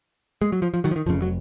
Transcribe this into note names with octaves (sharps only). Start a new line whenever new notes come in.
G#3
F#3
F3
F3
D#3 F#3
F3
D#3
F1 F2 C#3 F3
F#3